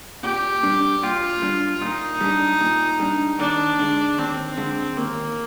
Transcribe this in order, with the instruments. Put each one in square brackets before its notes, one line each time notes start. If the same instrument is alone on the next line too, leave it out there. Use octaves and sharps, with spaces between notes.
[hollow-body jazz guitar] A#2 [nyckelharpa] G4
[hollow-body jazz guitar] G3 D4
[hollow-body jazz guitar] A#2 [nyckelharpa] F4
[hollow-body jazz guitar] G3 D4
[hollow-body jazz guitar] A#2 [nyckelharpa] D#4
[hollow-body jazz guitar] G3 D4
A#2
G3 D4
[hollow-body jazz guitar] D#2 [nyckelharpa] D4
[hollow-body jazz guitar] D3 G#3
[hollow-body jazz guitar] D#2 [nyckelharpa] C4
[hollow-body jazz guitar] D3 G#3
[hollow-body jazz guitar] D#2 [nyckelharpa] A#3